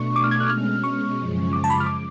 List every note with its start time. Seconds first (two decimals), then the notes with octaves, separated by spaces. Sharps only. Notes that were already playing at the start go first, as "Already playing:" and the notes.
Already playing: B2 A3 D4 C#6
0.16 D6
0.24 F6
0.31 G#6
0.40 F#6
0.49 B2 G#3 C#4 F6
0.84 C#6
1.18 F#2 C#3 F3 G#3
1.53 D6
1.64 A5
1.70 B5
1.80 F6
1.86 D6